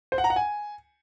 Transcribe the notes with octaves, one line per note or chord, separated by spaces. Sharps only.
C5
F#5
A#5
F#5
G#5